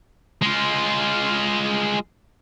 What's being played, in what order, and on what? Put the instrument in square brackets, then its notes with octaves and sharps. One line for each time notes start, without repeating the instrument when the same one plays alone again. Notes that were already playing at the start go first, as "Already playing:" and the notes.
[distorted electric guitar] G#3 F4